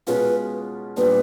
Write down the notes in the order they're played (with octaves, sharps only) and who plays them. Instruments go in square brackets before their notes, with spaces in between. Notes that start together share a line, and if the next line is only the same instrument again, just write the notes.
[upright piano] B2 G#3 C#4 F4 [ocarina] B4
[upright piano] A#2 G3 B3 D4 [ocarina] B4